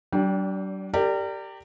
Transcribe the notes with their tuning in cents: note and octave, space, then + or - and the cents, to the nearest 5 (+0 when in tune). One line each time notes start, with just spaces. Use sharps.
G3 -45 D4 -20 G5 +0
G4 +0 A#4 -30 D5 +0